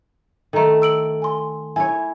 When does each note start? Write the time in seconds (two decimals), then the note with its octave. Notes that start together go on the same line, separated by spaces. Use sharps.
0.53 D#3 A3 A4 A#5
0.82 E6 D7 F#7
1.22 G#5 C6
1.76 E4 C#5 G#5